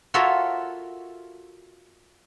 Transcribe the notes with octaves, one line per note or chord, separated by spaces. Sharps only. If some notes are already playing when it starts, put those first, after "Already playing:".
F4 F#4 A4 A#4 C#5 E5